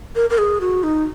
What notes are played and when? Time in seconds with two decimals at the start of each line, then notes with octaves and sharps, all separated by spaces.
0.15 A#4
0.30 A#4
0.38 G#4
0.61 F#4
0.83 D#4